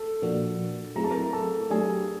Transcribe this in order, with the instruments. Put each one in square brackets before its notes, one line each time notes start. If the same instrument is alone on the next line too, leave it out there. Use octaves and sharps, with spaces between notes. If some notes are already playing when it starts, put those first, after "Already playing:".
Already playing: [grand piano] A4
[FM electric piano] A#2 F3 A#3 D4 F#4
[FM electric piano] F#3 A3 C4 E4 G#4 [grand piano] A#5
[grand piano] A5
A#4 A#5
A4 A5
[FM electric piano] F#3 A3 D4 G4 [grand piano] G#4 G#5